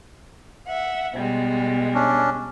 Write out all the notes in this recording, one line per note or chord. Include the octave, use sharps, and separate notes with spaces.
E5 F#5
B2 G3 G#3
C#4 D4